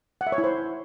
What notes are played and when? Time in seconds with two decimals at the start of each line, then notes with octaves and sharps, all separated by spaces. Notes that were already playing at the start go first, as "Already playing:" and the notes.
0.21 F#5
0.27 E5
0.32 C#5
0.38 E4
0.44 C5